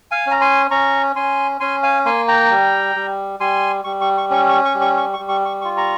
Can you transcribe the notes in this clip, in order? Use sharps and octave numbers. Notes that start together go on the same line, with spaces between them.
F5 G#5
C#4
A#5
G#5 C6
C#4 A#5 C#6
C#4 G#5 C6
C#4 G#5 C6
F5 G#5
A#3 G#5 C6
G5 A#5
G3
G3
G3 G#5 C6
G3 C#6
C#6
C#6
C#4 C#6
C#6
C#6
G3
C#6
C#6
C#6
G3
C#6
C#6
F4 C#6
A#5 C#6